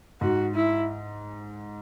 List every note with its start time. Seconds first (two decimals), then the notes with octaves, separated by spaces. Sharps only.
0.21 G#2 F#4
0.55 E4